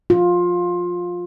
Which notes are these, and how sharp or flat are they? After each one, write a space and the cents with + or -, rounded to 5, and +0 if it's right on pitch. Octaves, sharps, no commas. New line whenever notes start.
F4 +15